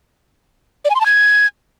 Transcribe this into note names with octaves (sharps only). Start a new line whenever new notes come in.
D5
G#5
C6
A5
G#6